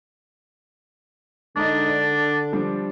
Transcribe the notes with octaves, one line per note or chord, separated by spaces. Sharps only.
D3 G#3 D4 D#4 D#5
D5
F3 G3 D4